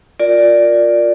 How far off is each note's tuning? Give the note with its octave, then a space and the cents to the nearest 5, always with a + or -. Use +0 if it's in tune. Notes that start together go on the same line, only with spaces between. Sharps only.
F4 +20 A#4 +0 D5 +5